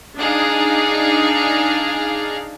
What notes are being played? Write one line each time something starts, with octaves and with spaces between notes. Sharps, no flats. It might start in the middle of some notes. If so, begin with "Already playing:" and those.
D4 D#4 G#4 F5